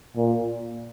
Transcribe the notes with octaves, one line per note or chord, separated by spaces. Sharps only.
A#2